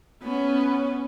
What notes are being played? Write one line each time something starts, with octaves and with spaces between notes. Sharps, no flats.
B3 C#4